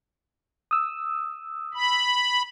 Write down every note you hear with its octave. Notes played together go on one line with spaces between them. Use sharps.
D#6 E6
B5